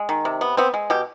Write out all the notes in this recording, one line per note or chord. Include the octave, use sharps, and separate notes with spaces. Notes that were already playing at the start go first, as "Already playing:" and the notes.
Already playing: G#3
D#3
C3
B3
B3 C4
G#3
B2 G4